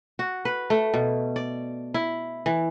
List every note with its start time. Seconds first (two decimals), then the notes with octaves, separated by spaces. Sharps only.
0.19 F#4
0.45 B4
0.70 A3
0.94 B2
1.36 D5
1.94 E4
2.46 E3